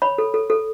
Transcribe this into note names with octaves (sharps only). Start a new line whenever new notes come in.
C#5 B5
A4
A4
A4